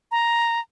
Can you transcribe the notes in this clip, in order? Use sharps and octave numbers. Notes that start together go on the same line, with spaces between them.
A#5